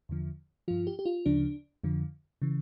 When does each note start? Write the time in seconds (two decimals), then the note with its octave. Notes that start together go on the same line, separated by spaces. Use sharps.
0.09 E2 D3 F3
0.68 G2 F3 F4
0.87 G4
0.99 G4
1.06 F4
1.26 D2 C#3 F3 D4
1.84 F2 D3 F3
2.42 C#3 E3